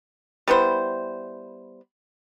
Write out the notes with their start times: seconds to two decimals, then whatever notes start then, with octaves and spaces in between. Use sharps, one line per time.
0.48 G3 B3 E4 C5